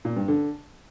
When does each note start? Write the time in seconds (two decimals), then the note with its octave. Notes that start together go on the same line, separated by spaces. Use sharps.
0.05 A#2
0.16 G2
0.28 D3